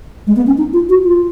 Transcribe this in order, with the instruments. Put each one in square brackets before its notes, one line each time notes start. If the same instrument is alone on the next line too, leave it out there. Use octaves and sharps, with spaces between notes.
[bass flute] G#3
B3
C#4
D#4
F4
F#4
F4